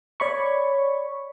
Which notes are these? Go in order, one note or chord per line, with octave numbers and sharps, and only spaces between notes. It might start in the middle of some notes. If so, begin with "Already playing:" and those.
C#5 D5 B5 C#6